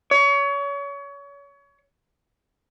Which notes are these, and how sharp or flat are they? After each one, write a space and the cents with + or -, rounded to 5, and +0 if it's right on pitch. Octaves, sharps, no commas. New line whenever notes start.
C#5 +30